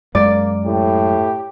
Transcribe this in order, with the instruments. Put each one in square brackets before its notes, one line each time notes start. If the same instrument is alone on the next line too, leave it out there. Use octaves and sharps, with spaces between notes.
[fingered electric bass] F#2 G#3 [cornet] A#3 [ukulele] D5
[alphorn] A2 [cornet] G4